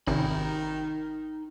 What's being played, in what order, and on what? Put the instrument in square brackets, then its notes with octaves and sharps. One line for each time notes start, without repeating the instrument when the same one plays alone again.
[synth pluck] G#1 [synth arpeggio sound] C3 [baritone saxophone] D#3 [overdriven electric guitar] D#4 B5